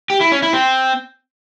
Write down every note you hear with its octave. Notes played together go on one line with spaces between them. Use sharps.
G4
E4
C#4
E4
C4